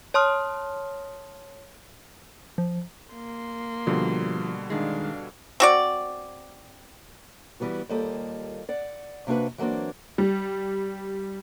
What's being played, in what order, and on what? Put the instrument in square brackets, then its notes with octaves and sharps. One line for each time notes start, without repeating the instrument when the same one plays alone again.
[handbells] C#5 A5 C6 D#6 F6
[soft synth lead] F3
[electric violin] A#3 C6
[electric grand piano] B2 D3 G3 [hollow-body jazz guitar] F3
[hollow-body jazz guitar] D#3 G#3 [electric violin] D4 F5
[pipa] C4 F#4 D5
[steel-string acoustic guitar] E3 G3 B3 F#4
D#2 G3 A#3 F4 A4 D#5
D5 F#5
C3 A#3 D4 F#4 B4
E3 F#3 A#3 C4 D4
[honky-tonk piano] G3